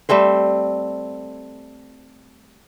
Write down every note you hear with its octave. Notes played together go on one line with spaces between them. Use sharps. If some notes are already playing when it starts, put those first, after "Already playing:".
G3 A3 C4 C5